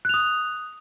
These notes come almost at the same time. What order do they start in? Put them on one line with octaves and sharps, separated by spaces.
F#6 F7 D#6